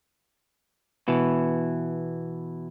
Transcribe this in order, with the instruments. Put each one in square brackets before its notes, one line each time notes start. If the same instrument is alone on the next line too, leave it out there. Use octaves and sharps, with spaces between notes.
[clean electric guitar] B2 E3